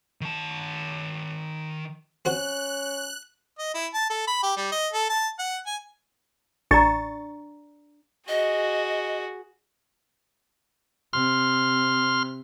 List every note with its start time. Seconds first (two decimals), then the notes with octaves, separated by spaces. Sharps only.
0.21 D#3 A5
2.25 C4 C#4 F#4 C5 F#6
3.59 D#5
3.74 E4
3.94 A5
4.10 A4
4.27 B5
4.43 G4
4.57 G3
4.72 D#5
4.93 A4
5.10 A5
5.39 F#5
5.66 G#5
6.71 A1 D4 D5 A#5 C#6 A6
8.28 F#4 G#4 D#5
11.13 C3 C6 F6